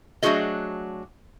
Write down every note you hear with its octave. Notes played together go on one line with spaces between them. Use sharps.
F#3 A3 D4 F#4 G#4 D#5